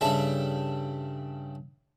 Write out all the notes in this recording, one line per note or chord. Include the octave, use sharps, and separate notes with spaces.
G2 C#3 G3 A4 E5 B5